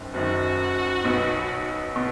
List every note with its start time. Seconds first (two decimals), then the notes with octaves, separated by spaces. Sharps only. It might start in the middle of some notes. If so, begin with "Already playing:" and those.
Already playing: F#1 F#2 D#3
0.14 F#1 F#2 D#3 F#4
1.04 B1 B2 B3 D#4
1.96 B2